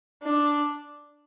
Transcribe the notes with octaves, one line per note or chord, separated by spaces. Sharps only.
D4